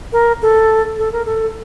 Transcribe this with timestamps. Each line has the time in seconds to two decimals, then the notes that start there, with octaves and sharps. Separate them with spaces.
0.13 A#4
0.42 A4
0.98 A4
1.13 A#4
1.25 A4